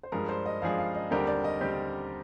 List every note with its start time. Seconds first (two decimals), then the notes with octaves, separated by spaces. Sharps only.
0.03 C5
0.12 G2 F3 G#3 D4 G#4 A#4
0.29 C5
0.46 D#5
0.62 G2 F3 G#3 D4 G#4 F5
0.79 F5
0.95 D#5
1.11 D#2 D3 G3 C4 G4 A#4
1.27 D5
1.44 D#5
1.61 D#2 D3 G3 C4 G4